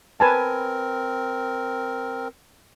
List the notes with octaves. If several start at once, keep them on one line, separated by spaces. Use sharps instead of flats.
C4 A#4 B4 G#5 A5